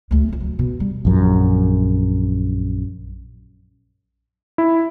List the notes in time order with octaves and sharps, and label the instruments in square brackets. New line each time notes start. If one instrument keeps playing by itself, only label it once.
[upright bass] D2 A3
D3 F3
D3 F#3
B2
G3
[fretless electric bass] A#1 F#2
[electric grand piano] E4